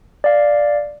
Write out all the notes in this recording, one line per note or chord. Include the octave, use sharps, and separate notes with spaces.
D5 F5